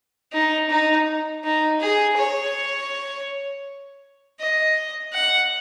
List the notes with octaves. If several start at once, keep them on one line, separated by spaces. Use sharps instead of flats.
D#4
D#4
D#4
G#4
C#5
D#5
F#5